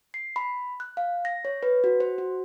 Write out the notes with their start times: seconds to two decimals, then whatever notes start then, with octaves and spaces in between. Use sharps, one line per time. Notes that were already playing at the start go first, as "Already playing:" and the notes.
0.14 C7
0.36 B5
0.80 F#6
0.97 F5
1.25 A#6
1.45 C#5
1.63 B4
1.84 F#4
2.00 C5
2.18 F#4